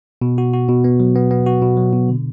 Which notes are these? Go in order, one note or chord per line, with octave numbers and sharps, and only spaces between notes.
B2
F#4
F#4
B2
B3
F#3
B3
B3
F#4
B2
F#3
B2
D3